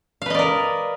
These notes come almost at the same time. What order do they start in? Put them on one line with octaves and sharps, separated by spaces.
F5 B4 D#5 D5 A#4